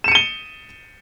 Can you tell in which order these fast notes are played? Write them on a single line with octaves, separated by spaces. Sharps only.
E7 C#7 D#7 G7